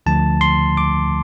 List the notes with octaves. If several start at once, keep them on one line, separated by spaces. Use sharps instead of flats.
D2 D3 F3 A3 A5
C6
D6